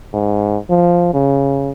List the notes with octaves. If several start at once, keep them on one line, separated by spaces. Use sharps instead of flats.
G#2
F3
C#3